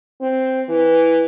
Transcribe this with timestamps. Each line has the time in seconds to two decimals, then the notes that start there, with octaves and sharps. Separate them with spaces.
0.22 C4
0.69 E3